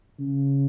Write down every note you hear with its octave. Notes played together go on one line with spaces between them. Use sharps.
C#3